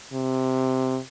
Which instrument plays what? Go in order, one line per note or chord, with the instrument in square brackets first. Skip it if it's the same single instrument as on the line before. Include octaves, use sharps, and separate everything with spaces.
[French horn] C3